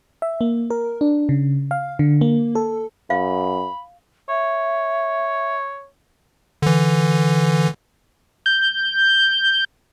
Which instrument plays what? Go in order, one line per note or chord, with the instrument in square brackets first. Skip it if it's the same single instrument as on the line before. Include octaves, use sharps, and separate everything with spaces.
[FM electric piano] E5
A#3
A#4
D4
C#3
F5
D3
A#3
A4
[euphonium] F#2 [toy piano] F5 [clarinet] B5
[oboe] C#5 [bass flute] E5
[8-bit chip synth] D3 E3
[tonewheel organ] G6